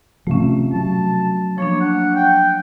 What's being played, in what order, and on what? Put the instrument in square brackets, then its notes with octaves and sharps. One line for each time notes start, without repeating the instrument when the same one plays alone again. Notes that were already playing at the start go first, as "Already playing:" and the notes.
[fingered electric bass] C3 F3 [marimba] A3 C#4
[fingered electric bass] F#3 [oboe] A5
[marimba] F3 A#3 D4 [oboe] C#5
[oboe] F#5
G5